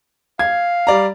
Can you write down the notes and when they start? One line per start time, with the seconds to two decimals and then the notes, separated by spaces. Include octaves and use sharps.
0.39 F5 G#6
0.87 G3 D5 A#5